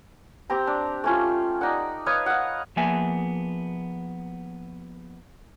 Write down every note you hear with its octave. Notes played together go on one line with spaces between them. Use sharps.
C4 G4 A#5
D4
A3 C#4 F4
D#4 D5 F#5
B4 C#5 D#5 F5
F5 F#5
F3 A#3 B3 G#4 E5 G#5